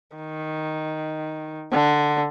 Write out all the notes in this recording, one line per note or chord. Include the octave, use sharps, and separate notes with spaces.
D#3
D3